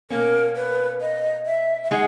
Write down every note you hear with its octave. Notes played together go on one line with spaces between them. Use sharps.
B2 A#3 C#4 A#4
B4
D#5
E5
E5
G#3 D#4 G#4 F#5